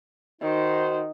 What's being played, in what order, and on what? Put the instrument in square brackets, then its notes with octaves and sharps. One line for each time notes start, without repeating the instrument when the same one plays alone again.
[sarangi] D#3 [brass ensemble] D#4 F#4 C5